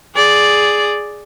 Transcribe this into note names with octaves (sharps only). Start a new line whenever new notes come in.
G#4 D5